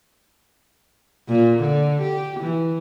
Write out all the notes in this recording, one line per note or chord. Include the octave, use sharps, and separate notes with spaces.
A#2
D3
G4
E3